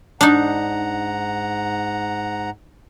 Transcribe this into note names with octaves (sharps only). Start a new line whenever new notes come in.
G#2 D4 D#4 F#5 A#5